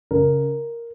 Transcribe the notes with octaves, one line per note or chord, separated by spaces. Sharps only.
C#3 A#4